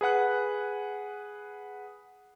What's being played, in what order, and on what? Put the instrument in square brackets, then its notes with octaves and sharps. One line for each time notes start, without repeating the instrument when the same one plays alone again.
[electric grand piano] G#4 B4 F#5 F#6